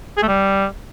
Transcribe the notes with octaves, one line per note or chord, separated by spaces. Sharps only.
G#4
A3
G3